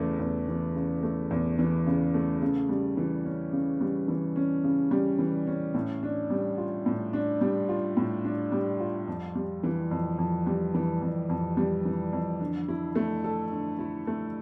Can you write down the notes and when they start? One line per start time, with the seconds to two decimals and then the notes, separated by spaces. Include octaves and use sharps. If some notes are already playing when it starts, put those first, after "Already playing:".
Already playing: E2 C#3 E3 A3
0.20 E2
0.48 E3
0.75 C#3
1.03 A3
1.31 E2
1.59 E3
1.86 C#3
2.14 A3
2.42 C#3
2.69 G3
2.97 E3
3.25 C#4
3.53 C#3
3.81 G3
4.08 E3
4.36 C#4
4.64 C#3
4.91 G3
5.19 E3
5.47 C#4
5.74 A2
6.03 D4
6.30 G3
6.58 F4
6.86 A2
7.13 D4
7.41 G3
7.69 F4
7.97 A2
8.24 D4
8.52 G3
8.80 F4
9.08 F2
9.35 G3
9.63 E3
9.91 F2
10.18 F2
10.47 G3
10.74 E3
11.02 F2
11.29 F2
11.57 G3
11.85 E3
12.13 F2
12.40 D3
12.68 E4
12.95 A3
13.24 A4
13.52 D3
13.79 E4
14.07 A3